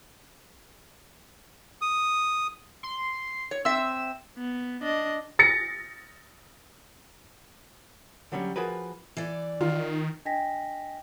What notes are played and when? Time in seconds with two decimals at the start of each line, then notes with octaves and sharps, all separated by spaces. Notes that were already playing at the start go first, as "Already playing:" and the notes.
1.81 D#6
2.83 C6
3.51 C#5
3.65 C4 E5 E6
4.38 B3
4.82 D4 D#5
5.39 A6 A#6 C#7
8.32 D3 F#3 G3 C#4
8.56 F3 F#4 G#4 A#4 B4
9.17 E3 D5
9.61 D#3 F4
10.25 D4 D#5 G5 G#5 A#6 B6